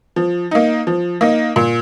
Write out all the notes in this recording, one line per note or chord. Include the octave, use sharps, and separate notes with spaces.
F3
A#3 D#4
F3
A#3 D#4
A#2